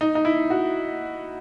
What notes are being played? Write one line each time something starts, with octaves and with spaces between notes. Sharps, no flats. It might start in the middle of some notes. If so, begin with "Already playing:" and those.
D#4
D#4
E4
F#4